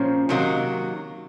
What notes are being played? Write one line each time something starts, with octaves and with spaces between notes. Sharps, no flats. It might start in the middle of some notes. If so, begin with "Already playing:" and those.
Already playing: A#2 F3 C4 C#4
C3 D#3 F#3 A#3